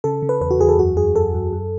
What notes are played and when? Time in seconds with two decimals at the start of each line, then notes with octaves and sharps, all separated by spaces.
0.04 C#3 A4
0.22 C#3
0.29 B4
0.41 E2 B4
0.51 F#4
0.60 E2 G#4
0.69 A4
0.78 F#2 F#4
0.97 F#2 G#4
1.15 F#2 A4
1.34 F#2
1.53 F#2